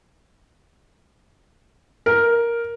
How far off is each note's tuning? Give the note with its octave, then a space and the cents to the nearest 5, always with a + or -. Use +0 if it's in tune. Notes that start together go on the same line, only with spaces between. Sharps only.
A#4 +5